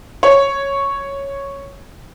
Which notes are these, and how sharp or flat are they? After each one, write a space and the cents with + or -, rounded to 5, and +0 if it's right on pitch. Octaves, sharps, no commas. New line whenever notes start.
C#5 -5